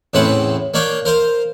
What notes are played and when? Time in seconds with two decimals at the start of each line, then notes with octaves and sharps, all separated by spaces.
0.14 E2 A2 C#3 C4 B4 F#5
0.74 A#3 D4 C#5 F5 G5
1.05 A#4 C5 F5